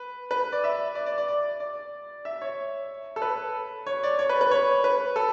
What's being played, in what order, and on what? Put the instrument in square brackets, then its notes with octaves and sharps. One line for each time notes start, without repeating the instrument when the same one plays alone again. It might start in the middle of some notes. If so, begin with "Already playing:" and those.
Already playing: [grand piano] B4
B4
D5
E5
D5
D5
D5
D5
D5
E5
C#5
A4
B4
C#5
D5
C#5
B4
B4
C#5
B4
A4